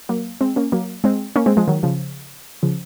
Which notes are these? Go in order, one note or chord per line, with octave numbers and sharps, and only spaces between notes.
F#3 A#3
G#3 C4
A#3 C#4
F#3 A#3
G#3 C4
A#3 C#4
G#3 C4
F3 G#3
D#3 F#3
C#3 F3
C#3 F3